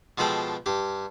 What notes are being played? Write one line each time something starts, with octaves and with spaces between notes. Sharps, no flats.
B2 F3 G#3 G#4 A4 G5
G2 G4